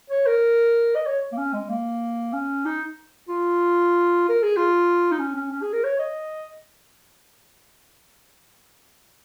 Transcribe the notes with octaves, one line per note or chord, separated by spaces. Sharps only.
C#5
A#4
D#5
C#5
A#3
C#4
G#3
A#3
C#4
D#4
F4
A#4
G#4
F4
D#4
C#4
C#4
C#4
G#4
A#4
C#5
D#5